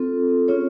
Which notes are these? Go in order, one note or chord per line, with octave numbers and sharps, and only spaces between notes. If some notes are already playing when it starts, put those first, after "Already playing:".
Already playing: C4 F4 A4
C#4 F4 G#4 C#5